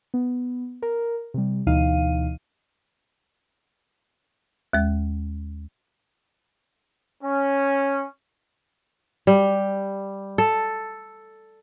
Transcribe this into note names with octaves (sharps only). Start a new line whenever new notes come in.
B3
A#4
C3 G3
D2 B2 E3 D#4 F5 D#7
D#2 G#3
C#4
G3
A4